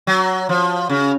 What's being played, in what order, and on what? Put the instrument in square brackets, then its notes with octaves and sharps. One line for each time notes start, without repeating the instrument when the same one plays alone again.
[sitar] F#3
F3
C#3